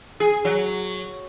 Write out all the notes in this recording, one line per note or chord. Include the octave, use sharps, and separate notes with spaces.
G#4
F#3